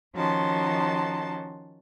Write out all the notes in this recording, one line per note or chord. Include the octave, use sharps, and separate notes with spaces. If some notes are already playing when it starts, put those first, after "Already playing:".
D#3 F3 C#4 F#4 A5 C6